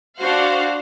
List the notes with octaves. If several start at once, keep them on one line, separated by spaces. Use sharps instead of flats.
D4 F#4 C5 F5 F#5